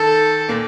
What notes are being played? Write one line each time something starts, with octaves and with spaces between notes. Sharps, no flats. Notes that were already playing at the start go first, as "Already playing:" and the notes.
Already playing: D#3 A4
A#2 A#3